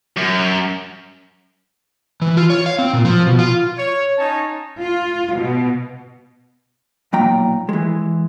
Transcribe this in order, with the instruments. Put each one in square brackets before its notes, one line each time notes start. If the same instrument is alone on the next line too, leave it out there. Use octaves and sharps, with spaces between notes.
[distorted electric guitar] F#2
[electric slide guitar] E3
F4
C#5
F5
C4
A#2
F3
B2
F4
[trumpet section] C#5
C#4 D#4 C#5 A5
[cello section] F4
B2
[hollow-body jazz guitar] B1 A#2 F#3 G5 A#5
E3 G#3